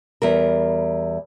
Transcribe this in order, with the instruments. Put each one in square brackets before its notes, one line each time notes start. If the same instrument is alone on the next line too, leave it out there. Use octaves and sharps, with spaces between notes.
[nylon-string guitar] E2 G3 A#4